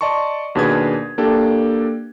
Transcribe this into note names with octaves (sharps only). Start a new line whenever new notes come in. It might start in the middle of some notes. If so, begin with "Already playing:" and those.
D5 D#5 A5 C6 C#6
D#2 B2 D4 G#4 B4 G#6
A#3 D4 G4 A4